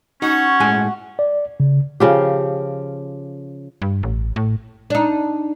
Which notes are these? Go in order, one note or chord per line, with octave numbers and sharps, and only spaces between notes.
C#4 D#4 F#4
A2 G#3 G#5
D5
C#3
C#3 F3 G4
G2
A1
A2
D4 D#4